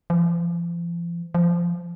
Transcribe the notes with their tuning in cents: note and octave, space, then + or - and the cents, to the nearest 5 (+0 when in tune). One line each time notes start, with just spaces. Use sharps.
F3 -40
F3 -20